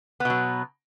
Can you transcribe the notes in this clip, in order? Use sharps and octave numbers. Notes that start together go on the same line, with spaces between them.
B2 F#3 B3